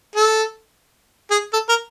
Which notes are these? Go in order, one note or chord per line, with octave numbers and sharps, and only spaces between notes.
A4
G#4
A4
A#4